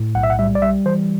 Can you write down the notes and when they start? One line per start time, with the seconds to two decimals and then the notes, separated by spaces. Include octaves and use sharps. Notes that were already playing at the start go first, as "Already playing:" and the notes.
Already playing: A2
0.15 B1 F#5
0.23 E5
0.30 F#5
0.39 G3 E5
0.55 D5
0.62 G3 E5
0.86 E3 C5